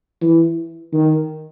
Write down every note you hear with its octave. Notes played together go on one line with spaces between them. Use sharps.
E3
D#3